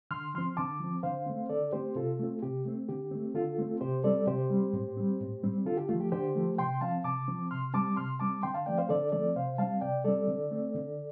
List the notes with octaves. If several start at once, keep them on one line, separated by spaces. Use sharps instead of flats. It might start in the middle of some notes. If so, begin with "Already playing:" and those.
D3 C6 F6
F3 C4 C6 F6
D3 A5 D6
F3 C4
D3 C5 F5
A3 C4
D3 A4 D5
A3 C4 G4 C5
C3 F4 A4
A3 C4
C3 G4
A3 C4
D3 G4
A3 C4
D3 F4 A4
A3 C4
C3 G4 C5
G3 C4 A4 D5
C3 G4 C5
G3 C4
A2
G3 C4
A2
G3 C4
D3 F4 A4
G4
F3 A3 F4
G4
D3 G4 C5
F3 A3
C3 G5 C6
F3 C4 F5 A5
C3 A5 D6
F3 C4
C3 C6 F6
G3 C4 A5 D6
C3 C6 F6
G3 C4 A5 D6
D3 G5 C6
F5 A5
F3 A3 C4 D5 G5
C5 F5
D3 A4 D5
F3 A3 C4 A4 D5
C3 C5 F5
G3 C4 F5 A5
C3 D5 G5
G3 C4 A4 D5
D3
A3 C4
D3